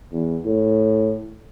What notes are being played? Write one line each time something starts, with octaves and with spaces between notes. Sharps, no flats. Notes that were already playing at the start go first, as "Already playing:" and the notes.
E2
A2